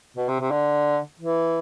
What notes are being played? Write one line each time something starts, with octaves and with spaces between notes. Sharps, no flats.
B2
C3
C3
D3
E3